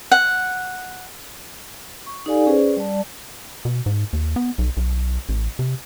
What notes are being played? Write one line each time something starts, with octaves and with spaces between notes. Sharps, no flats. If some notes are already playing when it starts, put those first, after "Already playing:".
F#5
C#6
D#4 G4 A4 D5 F5 G#5
C#4 G#4 B4 C5 D5
G3 D5 A5
B2
G#2
D#2
B3
B1
B1
A1
C3